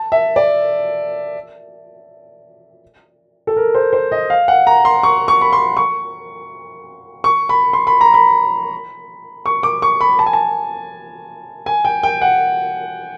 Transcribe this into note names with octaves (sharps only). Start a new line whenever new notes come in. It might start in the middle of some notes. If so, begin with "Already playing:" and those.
Already playing: A5
E5
D5
A4
A#4
C5
C5
D#5
F5
F#5
A#5
C6
C#6
C#6
B5
C6
C#6
C#6
B5
C6
B5
A#5
B5
C#6
D6
C#6
B5
A5
G#5
A5
G#5
G5
G5
F#5